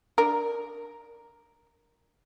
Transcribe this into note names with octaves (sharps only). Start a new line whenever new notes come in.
D4 A#4